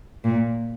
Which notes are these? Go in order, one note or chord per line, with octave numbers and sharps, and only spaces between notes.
A#2